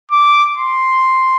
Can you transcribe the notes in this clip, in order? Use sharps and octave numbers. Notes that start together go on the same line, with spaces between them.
D6
C6